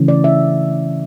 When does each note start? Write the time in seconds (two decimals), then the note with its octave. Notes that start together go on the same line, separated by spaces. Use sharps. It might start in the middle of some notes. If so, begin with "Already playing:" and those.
Already playing: C#3 E3 A3 C#4
0.08 D5
0.24 E5